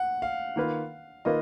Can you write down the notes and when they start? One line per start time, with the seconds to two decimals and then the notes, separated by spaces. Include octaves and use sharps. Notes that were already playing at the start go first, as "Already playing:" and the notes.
Already playing: F#5
0.22 F5
0.56 D#3 A#3 F4 B4
1.25 D#3 A#3 F4 B4 D#5